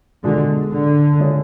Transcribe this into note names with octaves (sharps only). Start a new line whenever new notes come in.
B2 D3 G#3 D4
D3
C#3 G#3 C#4 G#4